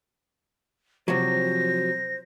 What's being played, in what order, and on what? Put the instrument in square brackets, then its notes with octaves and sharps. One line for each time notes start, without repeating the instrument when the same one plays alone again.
[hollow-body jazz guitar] C3 F#3 [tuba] F3 [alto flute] C5 [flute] A#6